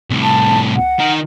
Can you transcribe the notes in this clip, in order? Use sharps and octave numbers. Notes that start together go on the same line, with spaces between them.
C2 A2
A5
F#5
D#3 A#4